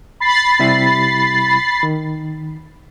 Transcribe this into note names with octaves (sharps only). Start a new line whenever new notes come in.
B5 A6 C7
C3 G3 E4
D#3